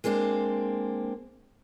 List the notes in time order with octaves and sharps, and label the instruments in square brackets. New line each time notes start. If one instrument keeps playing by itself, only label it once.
[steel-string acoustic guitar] G#3 A#3 C4 D4